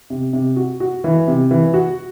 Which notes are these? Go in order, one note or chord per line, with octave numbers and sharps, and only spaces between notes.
C3
C3
F#4
F#4
E3
C3
E3
F#4